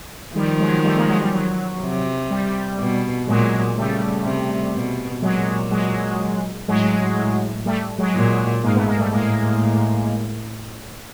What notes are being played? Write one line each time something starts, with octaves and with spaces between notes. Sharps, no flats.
D#3 F3 G3
F#3 G#3
G3 A3
G#3 A#3
F#3 G#3
G3
F#3
C3
G3
B2
A#2 F#3 G#3
C#3 G3 A3
C3
B2
A#2 F#3 G#3
F#3 G#3
A2 F#3 G#3
A2
G3 A3
F#3 G#3
A#2
G#2 G#3 A#3
A3 B3
G#3 A#3
G3 A3
A2 G#3 A#3